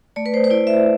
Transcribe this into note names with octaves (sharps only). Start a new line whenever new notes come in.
A3 D5
B4
C5
C5
E4 D5
E5